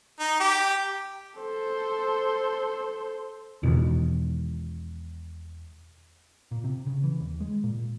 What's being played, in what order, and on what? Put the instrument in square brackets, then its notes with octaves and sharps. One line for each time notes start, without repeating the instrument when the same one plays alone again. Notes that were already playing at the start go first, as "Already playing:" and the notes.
[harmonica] D#4
G4
[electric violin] A4 C5
[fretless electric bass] E1 E2 B2 D#3
[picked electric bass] A#2
C3
C#3
E3
D#2
G#3
A#2